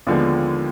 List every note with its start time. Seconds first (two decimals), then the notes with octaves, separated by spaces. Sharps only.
0.07 D#2 D3 F3 G#3 B3